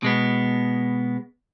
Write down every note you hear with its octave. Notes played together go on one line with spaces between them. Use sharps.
B2 G#3 B3